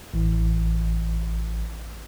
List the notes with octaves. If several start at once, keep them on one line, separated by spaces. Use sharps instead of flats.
A1 E3